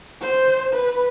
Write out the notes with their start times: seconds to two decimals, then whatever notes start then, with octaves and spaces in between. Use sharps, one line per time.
0.21 C5
0.74 B4